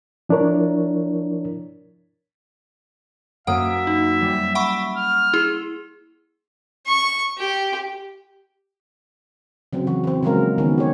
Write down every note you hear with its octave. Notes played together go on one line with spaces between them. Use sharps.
F3 D4 E4 A#4 C#5
F#2 A#3 E5 F#5 D#6
D#4
G3
E5 F#5 B5 C#6
F6
E4 G#4
C#6
G4
C#3 F#3 C4
E3 F#4
E3 C4
C#3 F3 F#3 G#3 A#3 A#4
D#3 B3 C#4
G4 C#5